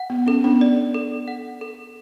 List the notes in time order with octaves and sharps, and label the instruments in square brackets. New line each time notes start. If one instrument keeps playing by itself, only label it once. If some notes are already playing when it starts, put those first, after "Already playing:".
Already playing: [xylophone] F#5
[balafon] B3
[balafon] C#4 [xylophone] A4
[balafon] B3 D4
[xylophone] D5
A4
F#5
A4